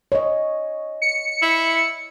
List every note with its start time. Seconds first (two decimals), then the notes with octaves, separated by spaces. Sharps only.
0.12 C#5 D#5
1.02 C#7
1.42 E4